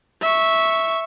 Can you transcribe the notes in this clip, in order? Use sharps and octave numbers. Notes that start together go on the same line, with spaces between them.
E5 C#6